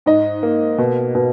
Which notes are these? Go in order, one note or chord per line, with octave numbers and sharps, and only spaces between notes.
G#2 D#5
A#3
B2
B2